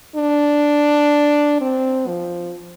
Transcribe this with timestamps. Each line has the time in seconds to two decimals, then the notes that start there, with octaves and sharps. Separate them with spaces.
0.16 D4
1.61 C4
2.08 F3